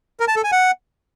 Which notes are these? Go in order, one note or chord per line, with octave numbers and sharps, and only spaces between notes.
A#4
A5
A4
G#5
F#5